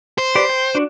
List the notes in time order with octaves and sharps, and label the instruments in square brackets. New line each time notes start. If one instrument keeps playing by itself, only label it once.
[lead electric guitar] C5
[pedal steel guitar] G4 B4 D5
G5
D4 F#4